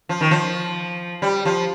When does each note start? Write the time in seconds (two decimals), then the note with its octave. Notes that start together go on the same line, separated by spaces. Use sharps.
0.09 F3
0.21 D#3
0.31 F3
1.22 G3
1.45 F3